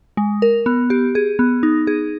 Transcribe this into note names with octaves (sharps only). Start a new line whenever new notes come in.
G#3
A#4
B3
G4
G#4
B3
D#4
G#4